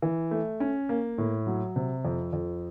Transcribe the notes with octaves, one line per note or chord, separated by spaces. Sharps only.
E3
A3
C#4
A#3
A2
F#3
C3
F2
F2